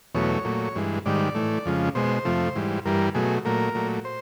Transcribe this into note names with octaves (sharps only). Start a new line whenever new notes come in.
E2 B2 F#3 A3 C#5
A#2 F#3 A3
G2 E3 G#3
G#2 D#3 G3 D5
A2 E3 A3
F2 C#3 F3 G#3
B2 G#3 C5
F2 C3 F3 A3
G#2 E3 G3
G2 E3 G3 A#4
B2 F#3 A3 G#4
A#2 F#3 A3 A#4
A#2 F#3 A3
C5